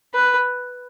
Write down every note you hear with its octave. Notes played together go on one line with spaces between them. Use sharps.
B4